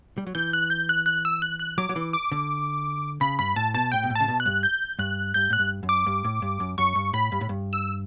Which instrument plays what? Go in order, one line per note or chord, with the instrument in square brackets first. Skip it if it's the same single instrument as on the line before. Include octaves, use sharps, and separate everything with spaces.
[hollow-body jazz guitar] G3
F#3
[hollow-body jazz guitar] E3 [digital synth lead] G6
[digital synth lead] F#6
G6
F#6
F#6
E6
F#6
F#6
[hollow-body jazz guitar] F#3 [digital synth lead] D6
[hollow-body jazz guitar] F#3
E3
[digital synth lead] D6
[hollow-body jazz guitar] D3
[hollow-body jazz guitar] C#3 [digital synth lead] B5
[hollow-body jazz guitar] G2 [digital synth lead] B5
[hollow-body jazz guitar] A2 [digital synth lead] A5
[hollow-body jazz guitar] B2 [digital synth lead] A5
[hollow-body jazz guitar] A2 [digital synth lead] G5
[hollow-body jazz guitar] B2
A2
[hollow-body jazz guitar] C#3 [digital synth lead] A5
[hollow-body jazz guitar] B2
[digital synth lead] F#6
[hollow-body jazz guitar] G2
[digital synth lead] G6
[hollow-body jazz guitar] G2 [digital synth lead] F#6
[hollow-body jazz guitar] G2 [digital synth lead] G6
[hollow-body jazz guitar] A2 [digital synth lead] F#6
[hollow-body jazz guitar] G2
F#2
[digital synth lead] D6
[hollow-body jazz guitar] G2
A2
G2
F#2
[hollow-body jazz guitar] F#2 [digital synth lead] C#6
[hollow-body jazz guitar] G2
[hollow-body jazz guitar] A2 [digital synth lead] B5
[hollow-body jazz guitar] G2
A2
G2
[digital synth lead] E6